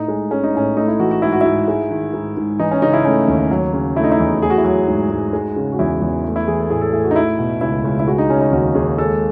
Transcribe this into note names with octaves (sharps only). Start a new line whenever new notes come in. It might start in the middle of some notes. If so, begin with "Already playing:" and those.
Already playing: A2 D#4
G#3
G#3 C#4
D#4
A2 C#4
A3 D#4
E4
E3 F#4
F#4
G#2 E4
F#4
G#2 E4
G#3
D#3
G#2
G#2
E3 D#4
C#4
C#3 D#4
E4
A3 C#4
D#2
F#3
C#3
A3 E4
D#4
E4
E2
A3 G#4
F#4
E4
F#3 F#4
G#2
G#2
G#3
C#3
F#4
E2 E4
E2
A3
E4
E3 G#4
A4
A2 G#4
A4
A2 G#4
F#4
D#4
A3 E4
B2
C#2 E4
C#2
E4
G#3 F#4
D#4
C#3 C#4
D#4
D#2 F#4
D#2 G#4
G#3 A4